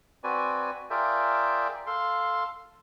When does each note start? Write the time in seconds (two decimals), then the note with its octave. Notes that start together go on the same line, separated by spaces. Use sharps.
0.24 C4 F#4 B4 D5 G#5
0.90 F4 G#4 A#4 D5 E5 G5
1.87 A4 F5 C6